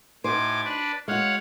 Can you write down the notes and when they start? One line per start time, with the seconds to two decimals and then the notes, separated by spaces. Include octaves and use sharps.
0.24 A2 D#4 F#4 C5 G#5 D6
0.64 D4 B4 D5
1.08 G#3 F#4 C#5 F5 F#5